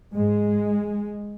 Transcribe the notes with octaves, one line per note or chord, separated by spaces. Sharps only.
G#2 G#3